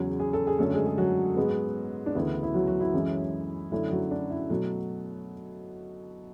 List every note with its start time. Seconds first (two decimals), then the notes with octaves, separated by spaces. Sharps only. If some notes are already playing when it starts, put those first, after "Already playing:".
Already playing: E2 C#3 F#3 C#4
0.20 G#4
0.33 A4
0.47 G#4
0.58 F#2 D3 A3 C#4 A4
0.74 G#3 G#4
0.86 G#4
0.98 F#3 F#4
1.37 G#2 G#3 B3
2.06 D4
2.15 D2 C#3 E3 B3 E4
2.43 E4
2.54 F#3 F#4
2.67 F#3 F#4
2.80 E4
2.94 F#2 E3 G#3 C#4
3.72 F#2 D3 A3 C#4 E4
3.91 F#3 F#4
4.11 D4
4.30 E4
4.50 B2 F#3 A3 F#4